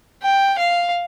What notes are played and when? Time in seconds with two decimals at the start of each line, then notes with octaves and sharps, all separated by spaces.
0.23 G5
0.59 F5